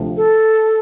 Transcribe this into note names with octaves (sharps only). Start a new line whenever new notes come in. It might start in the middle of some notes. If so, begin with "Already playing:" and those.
Already playing: D2 C3 F3
A4